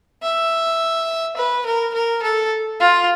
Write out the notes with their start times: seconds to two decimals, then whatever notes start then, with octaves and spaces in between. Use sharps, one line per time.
0.23 E5
1.37 B4
1.66 A#4
1.94 A#4
2.22 A4
2.80 F4